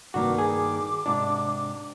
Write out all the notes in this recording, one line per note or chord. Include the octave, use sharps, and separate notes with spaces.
C2 G2 D#3 A#3 F#4 D6
G#4
G#2 C3 D4